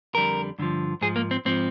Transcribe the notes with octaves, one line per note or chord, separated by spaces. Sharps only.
F2 D3 G3 A#4
G2 D3 F3
G#2 F3 G#4
A#3
C4
G#2 F3 C4